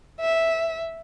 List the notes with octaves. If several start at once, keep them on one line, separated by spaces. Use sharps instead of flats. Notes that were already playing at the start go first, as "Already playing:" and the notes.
E5